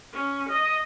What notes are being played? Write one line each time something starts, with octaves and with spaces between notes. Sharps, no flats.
C#4
D#5